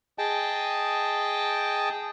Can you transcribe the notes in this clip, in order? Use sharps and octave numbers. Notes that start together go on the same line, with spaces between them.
G#4 D#5 G5 A5